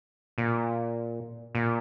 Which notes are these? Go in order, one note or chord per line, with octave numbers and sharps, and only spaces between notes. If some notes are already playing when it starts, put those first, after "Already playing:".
A#2
A#2